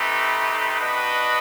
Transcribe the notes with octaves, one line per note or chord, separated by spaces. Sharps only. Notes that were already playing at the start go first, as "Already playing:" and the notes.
Already playing: A3 C4 D#4 G4 B4
D4 F#4 B4 D#5